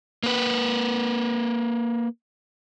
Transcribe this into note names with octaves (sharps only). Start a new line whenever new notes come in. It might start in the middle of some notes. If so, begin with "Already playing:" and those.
A#3 B4